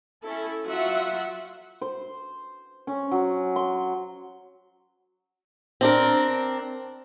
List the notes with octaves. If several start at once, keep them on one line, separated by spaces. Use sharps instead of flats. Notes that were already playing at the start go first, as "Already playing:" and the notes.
C#4 E4 A4
F#3 F4 E5 F#5
C5
C#4
F#3
C6
C4 D4 A#4